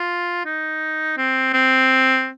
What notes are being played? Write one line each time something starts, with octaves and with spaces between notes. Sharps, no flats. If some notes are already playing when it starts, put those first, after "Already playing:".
Already playing: F4
D#4
C4
C4